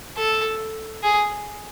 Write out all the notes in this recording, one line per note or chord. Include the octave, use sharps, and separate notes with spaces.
A4
G#4